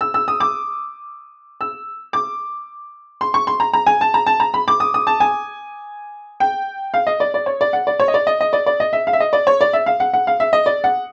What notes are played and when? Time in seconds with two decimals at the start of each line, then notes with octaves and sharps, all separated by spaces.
0.01 E6
0.14 E6
0.28 D#6
0.40 D6
1.61 E6
2.13 D6
3.21 C6
3.34 C#6
3.47 C6
3.60 A#5
3.73 A#5
3.86 G#5
4.01 A5
4.14 A#5
4.26 A5
4.40 A#5
4.54 B5
4.68 D6
4.80 D#6
4.94 D#6
5.07 A5
5.20 G#5
6.40 G5
6.94 F5
7.07 D#5
7.20 D5
7.34 D5
7.46 C#5
7.61 D5
7.73 F#5
7.87 D5
8.00 C#5
8.08 D#5
8.14 D5
8.27 D#5
8.41 D#5
8.53 D5
8.66 D5
8.80 D#5
8.93 E5
9.07 F5
9.13 E5
9.20 D#5
9.33 D5
9.47 C#5
9.61 D5
9.73 E5
9.86 F5
10.00 F#5
10.14 F#5
10.27 F5
10.40 E5
10.53 D#5
10.66 D5
10.84 F#5